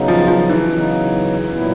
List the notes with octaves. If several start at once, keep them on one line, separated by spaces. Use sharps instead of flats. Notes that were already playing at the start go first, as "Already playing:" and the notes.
Already playing: C#3 F#3 B3 D#4
F3
F3
E3
C#3 F#3 B3 D#4
A#2 F#3 B3 E4